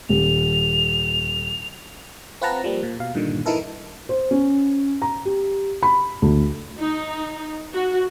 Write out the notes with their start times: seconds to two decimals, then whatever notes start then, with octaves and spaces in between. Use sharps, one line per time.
0.09 D#1 F7
2.42 C4 F4 B4 F#5 A5 A#5
2.64 F3 G3 A#3
2.83 A#2
2.99 B2 F5
3.15 G2 A#2 D3 D#3
3.46 D#3 E3 D#4 E4 A4 A#4
4.09 C5
4.31 C#4
5.02 A#5
5.25 G4
5.83 B5
6.22 D2
6.79 D#4
7.75 F#4